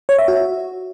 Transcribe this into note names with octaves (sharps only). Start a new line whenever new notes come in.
C#5
E5
F#4